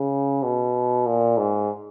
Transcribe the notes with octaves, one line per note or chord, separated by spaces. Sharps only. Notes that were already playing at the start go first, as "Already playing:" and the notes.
Already playing: C#3
B2
A#2
G#2